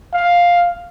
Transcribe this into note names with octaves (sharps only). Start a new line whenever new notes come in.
F5